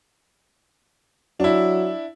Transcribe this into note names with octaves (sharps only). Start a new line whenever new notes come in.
F#3 D4 E4